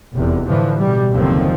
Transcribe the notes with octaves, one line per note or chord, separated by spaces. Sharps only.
F1 E2 C3
A2 D3 E3 F3
B2 G3
F#1 D#2 D3 D#3 F3 C4